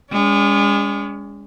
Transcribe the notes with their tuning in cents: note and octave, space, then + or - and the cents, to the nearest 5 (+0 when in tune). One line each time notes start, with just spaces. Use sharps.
G#3 -30 C#4 +40